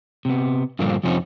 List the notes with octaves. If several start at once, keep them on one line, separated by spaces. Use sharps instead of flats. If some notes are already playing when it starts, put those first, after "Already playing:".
C3 B3
G2 A#2 D3 F3 A#3 D4
F2 C3 F3 C4 C#4 D#4